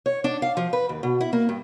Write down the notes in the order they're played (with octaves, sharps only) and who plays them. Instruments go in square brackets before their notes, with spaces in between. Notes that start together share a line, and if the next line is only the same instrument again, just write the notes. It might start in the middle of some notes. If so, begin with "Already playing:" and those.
[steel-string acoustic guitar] C#5
D4
F5
F3
B4
D#2
B2
E4
A#3
G2